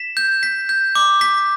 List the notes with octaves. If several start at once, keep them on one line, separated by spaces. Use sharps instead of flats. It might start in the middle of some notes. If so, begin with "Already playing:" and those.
Already playing: B6 E7
G6
B6
G6
D6
B6